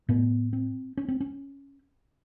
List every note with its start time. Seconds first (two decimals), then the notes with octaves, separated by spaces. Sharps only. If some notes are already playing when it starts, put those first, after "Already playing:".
0.09 A2 B3
0.53 C4
0.97 C#4
1.08 C4
1.20 C#4